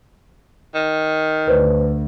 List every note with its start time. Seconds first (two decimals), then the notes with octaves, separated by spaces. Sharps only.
0.74 D#3
1.48 D2 B4 C5 D5